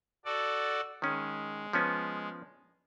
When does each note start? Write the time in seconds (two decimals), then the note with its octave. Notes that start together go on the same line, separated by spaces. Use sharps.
0.25 F#4 A4 D5
1.02 D#3 G#3 C#4
1.73 F3 B3 C#4